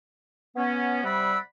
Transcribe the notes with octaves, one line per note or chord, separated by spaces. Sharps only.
B3 C#4
C3 G3 D5 F#5 B5 E6